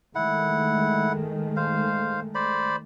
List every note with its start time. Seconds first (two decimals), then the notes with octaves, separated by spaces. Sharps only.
0.15 D#3 G#3 A3 E4 F#5
1.56 C5 F5
2.35 C5 D5 B5